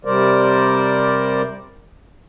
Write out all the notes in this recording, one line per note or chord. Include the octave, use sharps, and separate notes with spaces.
C3 G3 A#4 C5 D5